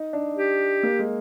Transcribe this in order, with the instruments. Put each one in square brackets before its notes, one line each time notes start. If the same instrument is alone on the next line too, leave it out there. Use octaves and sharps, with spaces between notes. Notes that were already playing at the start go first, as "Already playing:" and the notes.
Already playing: [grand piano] D#4
D4
[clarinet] G4
[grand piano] A#3
G#3